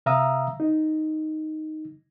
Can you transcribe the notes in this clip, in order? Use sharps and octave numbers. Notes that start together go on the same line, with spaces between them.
C3 E5 F5 A#5 D#6 E6
D#4